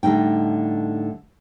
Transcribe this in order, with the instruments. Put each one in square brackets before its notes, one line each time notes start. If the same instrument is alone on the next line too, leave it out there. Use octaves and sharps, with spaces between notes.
[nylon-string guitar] A2 D3 G3 D#4 G5